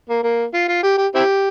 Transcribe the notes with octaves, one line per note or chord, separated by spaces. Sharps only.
A#3
A#3
F4
F4
G4
G4
C4 E4 G4